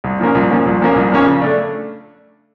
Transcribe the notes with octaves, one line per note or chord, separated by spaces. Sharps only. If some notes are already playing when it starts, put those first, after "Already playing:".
C2
A#2 F3 A#3 C#4
C2
A#2 F3 A#3 C#4
C2
A#2 F3 A#3 C#4
C2
A#2 F3 A#3 C#4
C#3
A3 D4